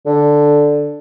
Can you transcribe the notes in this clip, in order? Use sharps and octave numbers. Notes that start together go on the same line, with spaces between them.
D3